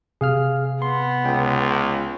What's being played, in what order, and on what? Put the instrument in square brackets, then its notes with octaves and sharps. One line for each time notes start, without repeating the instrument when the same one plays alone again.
[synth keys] C3 [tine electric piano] G#4 F5 F6
[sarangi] B3 [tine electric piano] C6
[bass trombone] C#2 [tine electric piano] G5